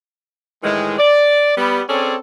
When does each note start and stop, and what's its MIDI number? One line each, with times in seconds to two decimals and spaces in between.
0.63 0.95 45
0.63 0.95 51
0.63 0.95 52
0.63 0.95 56
0.99 1.54 74
1.57 1.82 55
1.57 1.82 59
1.89 2.15 60
1.89 2.15 61
1.89 2.15 68
1.89 2.15 69
1.89 2.15 73
1.89 2.15 74